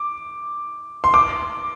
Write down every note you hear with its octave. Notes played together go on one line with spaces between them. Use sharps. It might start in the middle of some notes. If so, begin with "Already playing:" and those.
Already playing: D6
C6
D6